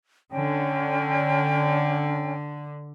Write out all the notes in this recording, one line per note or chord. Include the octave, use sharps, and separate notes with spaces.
D3 C#4 C#5 G5